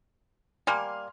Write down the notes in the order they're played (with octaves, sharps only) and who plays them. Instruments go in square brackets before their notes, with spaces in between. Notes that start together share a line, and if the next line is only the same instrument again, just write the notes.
[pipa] G3 A#3 [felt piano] G#5 C6 F6